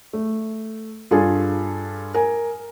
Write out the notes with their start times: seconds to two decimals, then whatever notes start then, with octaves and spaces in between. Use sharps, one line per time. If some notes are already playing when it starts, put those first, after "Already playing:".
0.13 A3
1.11 G2 F4 G#4 A4 G#5
2.14 A#4 G#5